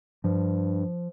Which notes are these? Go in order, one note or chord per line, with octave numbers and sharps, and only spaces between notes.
G2 F3